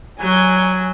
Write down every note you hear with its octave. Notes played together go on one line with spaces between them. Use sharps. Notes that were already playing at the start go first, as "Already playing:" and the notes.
F#3 G#5